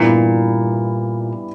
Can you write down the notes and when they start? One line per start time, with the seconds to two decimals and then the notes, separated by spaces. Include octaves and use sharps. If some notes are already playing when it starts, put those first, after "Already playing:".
Already playing: G2 A#2 E3 G3 B3